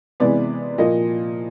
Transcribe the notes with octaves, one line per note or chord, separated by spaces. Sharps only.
C3 E3 G#3 B3 D5
A#2 F3 A#3 D#5